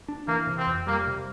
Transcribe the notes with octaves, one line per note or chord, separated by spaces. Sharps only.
D4
E3 A#3
C3
C4
F2
G3 A#3
C3